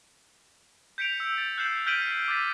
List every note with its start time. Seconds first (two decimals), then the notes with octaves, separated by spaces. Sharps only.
0.98 G6 B6 C#7 D7 F7
1.20 E6
1.38 A6
1.58 F#6 G6 C7 E7 F#7
1.86 F6 G6 B6 D7 D#7 F#7
2.28 D6 E6 A6 B6